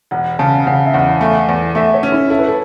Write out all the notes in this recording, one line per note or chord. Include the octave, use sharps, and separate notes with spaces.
E1 F#5
C#3 A5
C#3 F#5
E5
E2 F#5
A3
E2
A3 E5
C#5
C#4
E4
E4 A4
B4
A4